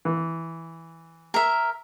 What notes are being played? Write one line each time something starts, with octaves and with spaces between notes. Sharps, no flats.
E3
A#4 E5